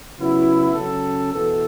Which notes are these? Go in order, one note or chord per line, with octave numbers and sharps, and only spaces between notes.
C#3 F#3 B3 E4
C#3 F#3 C#4 A4
E2 B2 B3 E4 A4